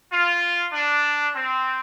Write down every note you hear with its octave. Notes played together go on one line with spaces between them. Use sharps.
F4
D4
C4